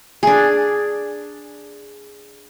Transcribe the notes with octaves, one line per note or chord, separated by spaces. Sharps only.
D4 G#4